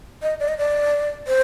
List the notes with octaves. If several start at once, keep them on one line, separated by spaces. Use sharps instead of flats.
D#5
D5
D#5
D5
C5